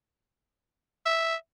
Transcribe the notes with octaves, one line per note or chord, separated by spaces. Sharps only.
E5